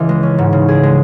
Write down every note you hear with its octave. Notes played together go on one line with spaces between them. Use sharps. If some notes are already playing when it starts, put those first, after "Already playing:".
Already playing: C#2 E3
G#3
C#4
G#2
C#3
G#4
G#3